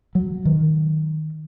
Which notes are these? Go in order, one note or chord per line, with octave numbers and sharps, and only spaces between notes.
F#3
D#3